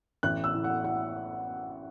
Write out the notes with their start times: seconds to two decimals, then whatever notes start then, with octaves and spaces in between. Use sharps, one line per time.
0.23 A1 F#6
0.44 E6
0.54 A2
0.64 F#5
0.84 A2 F#5